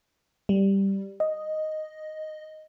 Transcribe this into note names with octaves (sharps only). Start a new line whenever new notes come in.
G3
D#5